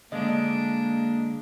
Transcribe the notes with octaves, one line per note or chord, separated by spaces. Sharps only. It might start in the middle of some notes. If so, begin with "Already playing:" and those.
D3 G#3 A#3 D4 D#5